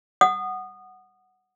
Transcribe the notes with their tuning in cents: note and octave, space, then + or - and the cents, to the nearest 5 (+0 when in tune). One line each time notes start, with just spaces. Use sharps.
F#5 +0 D#6 -25